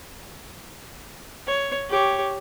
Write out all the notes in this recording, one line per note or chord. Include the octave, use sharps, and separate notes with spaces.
C#5
G4 C#5